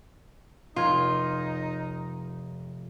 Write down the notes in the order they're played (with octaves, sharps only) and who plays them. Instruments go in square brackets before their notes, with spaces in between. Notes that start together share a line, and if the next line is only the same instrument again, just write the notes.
[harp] F1 G#6 [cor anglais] D#4 [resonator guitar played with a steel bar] F4